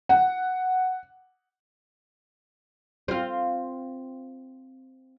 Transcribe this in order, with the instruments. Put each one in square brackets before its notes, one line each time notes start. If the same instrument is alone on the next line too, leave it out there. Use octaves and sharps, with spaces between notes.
[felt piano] F#5
[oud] C4 F4